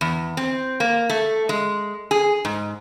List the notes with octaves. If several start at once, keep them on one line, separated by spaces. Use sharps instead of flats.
E2
C4
A#3
A3
G#3
G#4
G#2